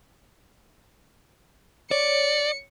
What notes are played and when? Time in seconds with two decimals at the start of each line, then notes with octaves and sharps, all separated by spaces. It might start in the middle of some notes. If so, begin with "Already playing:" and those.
1.91 C#5 D5 C#7